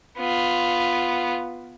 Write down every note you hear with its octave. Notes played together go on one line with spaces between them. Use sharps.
B3 F4